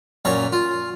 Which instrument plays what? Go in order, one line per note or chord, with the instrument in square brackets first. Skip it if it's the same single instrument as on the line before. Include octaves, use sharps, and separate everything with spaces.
[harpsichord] F#2 A#2 C#5 A#5
F4